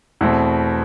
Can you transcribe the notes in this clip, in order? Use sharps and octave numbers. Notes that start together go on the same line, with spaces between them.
E2 B2 A3 C4